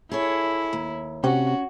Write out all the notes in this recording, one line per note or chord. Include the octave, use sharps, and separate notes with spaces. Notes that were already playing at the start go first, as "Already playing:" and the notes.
E4 G#4 A4 C#5
D#2
C3 C#4 F#4